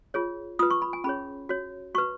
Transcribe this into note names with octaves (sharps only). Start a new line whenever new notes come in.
F4 G#4 C#5
F4 B4 D#6
C#6
B5
G#5
C#4 G#4 C#5 B5
F#4 C#5
F#4 B4 C#6